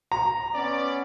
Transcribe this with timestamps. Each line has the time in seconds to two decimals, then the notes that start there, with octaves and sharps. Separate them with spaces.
0.12 A#5
0.54 B3 C#4 D5